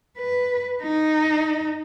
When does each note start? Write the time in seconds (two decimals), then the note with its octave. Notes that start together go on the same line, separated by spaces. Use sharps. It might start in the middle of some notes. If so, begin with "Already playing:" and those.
0.19 B4
0.83 D#4